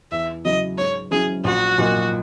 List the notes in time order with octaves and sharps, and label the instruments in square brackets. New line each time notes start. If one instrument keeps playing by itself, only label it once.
[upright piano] E2 [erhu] E5
[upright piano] C#3 F#3 C#4 E4 [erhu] D#5
[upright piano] G#2 [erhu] C#5
[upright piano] F#3 C#4 E4 [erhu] G#4
[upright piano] A#1 [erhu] F#4
[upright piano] A#2 F#3 A#3 D#4